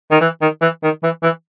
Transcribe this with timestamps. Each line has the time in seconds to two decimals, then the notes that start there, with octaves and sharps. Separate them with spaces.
0.11 D#3
0.21 E3
0.42 D#3
0.61 E3
0.83 D#3
1.03 E3
1.23 E3